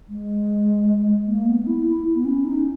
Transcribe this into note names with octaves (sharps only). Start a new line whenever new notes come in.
G#3
A#3
B3
E4
E4
B3
C#4
D#4